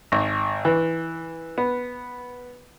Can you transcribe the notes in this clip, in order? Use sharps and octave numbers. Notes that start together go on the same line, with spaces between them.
G#1
E3
B3